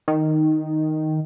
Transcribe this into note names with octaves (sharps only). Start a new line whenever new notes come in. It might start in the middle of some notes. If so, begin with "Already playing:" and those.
D#3